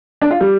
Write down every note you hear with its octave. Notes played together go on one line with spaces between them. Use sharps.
D4
F4
G3